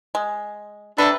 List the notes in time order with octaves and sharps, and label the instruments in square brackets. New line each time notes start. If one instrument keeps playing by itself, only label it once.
[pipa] G#3
[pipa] C3 G3 B4 [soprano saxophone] D4 [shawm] A4